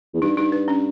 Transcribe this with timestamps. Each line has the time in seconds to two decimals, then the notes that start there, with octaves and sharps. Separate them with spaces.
0.14 E2
0.22 G2 D#4
0.37 G2 D#4
0.52 B4
0.68 C#4